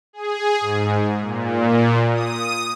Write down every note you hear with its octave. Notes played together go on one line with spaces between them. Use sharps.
G#4
G#2
A#2
D#6